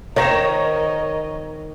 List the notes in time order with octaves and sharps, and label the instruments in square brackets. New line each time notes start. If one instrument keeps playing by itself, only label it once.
[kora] D#3 [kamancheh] A#4 D#5 [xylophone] C5 A#5 [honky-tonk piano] C#5 A#6 E7